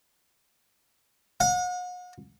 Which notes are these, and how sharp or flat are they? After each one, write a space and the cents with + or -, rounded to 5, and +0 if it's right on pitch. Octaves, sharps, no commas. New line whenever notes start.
F#5 -40